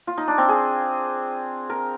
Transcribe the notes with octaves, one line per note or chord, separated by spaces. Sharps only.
F4
D#4
D4
C4
G#4
A#4